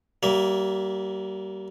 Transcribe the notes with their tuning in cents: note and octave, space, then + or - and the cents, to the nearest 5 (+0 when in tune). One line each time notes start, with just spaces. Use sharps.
G3 -35 A#3 +0 E5 +0